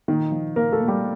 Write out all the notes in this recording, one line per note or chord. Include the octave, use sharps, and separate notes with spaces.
A#2 D#3 D#4
F3
A#2 A#3 A#4
A3 A4
A#2
G3 G4